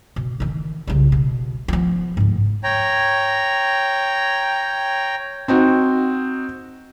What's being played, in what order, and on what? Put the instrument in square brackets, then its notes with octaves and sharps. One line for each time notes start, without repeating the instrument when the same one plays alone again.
[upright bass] B2
D#3 E3
C2 C#3
B2
F3 B3
D2 G#2
[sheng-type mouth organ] C#5 G5 A#5
[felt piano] C4 D#4 F#4